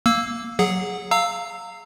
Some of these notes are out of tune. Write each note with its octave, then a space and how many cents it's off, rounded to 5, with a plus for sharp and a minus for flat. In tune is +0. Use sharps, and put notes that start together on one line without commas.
A#3 +0 E6 +0
F#3 +0 G#4 +0 F#5 -10
F5 +0 A#5 -25 E6 +0